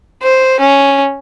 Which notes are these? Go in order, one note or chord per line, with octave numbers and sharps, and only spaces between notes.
C5
C#4